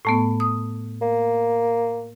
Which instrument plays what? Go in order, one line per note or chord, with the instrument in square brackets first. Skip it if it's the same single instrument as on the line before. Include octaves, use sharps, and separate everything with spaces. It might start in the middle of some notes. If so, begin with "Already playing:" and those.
[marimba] A2 A3 B3
D#6
[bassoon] A#3